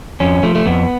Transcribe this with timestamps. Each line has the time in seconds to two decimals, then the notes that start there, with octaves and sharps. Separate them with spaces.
0.20 F2 C#4
0.43 F3 A3
0.55 A3
0.66 F2 B3